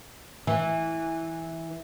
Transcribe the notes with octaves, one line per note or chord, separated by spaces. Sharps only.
E3